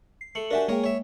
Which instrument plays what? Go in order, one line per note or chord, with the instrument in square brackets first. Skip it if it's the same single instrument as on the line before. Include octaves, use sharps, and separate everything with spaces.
[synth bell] C7
[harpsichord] A3 [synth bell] C#7 F#7
[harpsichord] D4 F#4 G4 [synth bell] A#4 E5 G#5
[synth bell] G#3 A#3 G5 [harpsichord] G#4 A#4 C#5
[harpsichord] C#5 E5